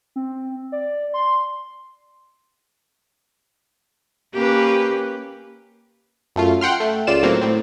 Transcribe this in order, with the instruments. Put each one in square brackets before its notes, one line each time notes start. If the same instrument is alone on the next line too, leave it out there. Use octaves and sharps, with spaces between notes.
[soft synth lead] C4
D5
C6
[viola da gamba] A#3 C#4 B4 [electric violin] G4
[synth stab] F#2 A3 F4
F#5 G5 C6 F6
A3
C#2 F4 D5 E7
A2 F#3 A#3 C4
A2 C4